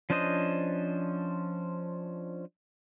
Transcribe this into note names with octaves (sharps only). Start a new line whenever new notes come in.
F3 C#4 D4 C5 D#5